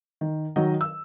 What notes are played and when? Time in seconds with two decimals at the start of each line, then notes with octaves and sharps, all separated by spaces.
0.21 D#3
0.56 D#3 F#3 D#5
0.81 E6